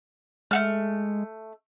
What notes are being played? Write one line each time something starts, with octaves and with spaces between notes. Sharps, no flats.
G#3 A3 F#4 F6